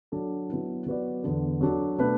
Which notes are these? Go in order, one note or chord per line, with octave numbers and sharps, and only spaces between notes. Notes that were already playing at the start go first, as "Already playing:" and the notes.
F#3 D4 A4
F#3 B3 E4
F#3 B3 F#4 B4 D5
E2 D3 B3
F#3 D4 F#4 A4
B2 A3 D4 B4